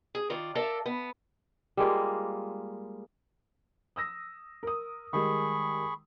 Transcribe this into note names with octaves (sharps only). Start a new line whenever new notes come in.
G#4
D#3 F4 D5 A#5
A4 A#4 D5 E5 F5 A5
B3
G3 G#3 A#3 F4
D#6 E6 A#6
A#4 D#6
D#3 G3 G#3 G#4 B5 C#6